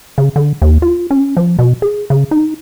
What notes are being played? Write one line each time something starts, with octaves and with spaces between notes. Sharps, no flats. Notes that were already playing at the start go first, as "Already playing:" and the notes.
C#3
D3
D#2
F4
C#4
F3
B2
G#4
C#3
D#4